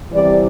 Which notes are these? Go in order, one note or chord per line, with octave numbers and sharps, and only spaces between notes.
C3 E3 G3 D5